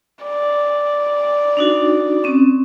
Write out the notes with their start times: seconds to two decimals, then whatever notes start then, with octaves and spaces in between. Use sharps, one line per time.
0.23 D5
1.57 D4 D#4 F#4
2.24 C4 C#4